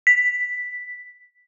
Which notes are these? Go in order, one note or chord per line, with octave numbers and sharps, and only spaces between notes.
B6